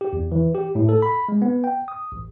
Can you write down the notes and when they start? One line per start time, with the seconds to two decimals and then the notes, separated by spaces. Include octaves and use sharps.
0.01 G4
0.13 E2
0.32 E3
0.55 G4
0.75 A2
0.89 A4
1.02 B5
1.29 G#3
1.42 B3
1.64 G5
1.88 D#6
2.12 A1